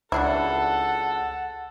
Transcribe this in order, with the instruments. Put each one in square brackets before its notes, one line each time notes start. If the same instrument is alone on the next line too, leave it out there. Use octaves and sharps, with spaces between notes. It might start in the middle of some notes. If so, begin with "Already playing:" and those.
[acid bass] C#2 [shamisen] F#3 D4 E4 [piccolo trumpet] A4 [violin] F#5